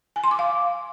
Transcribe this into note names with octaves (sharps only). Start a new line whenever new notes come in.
G#5
C6
D6
F5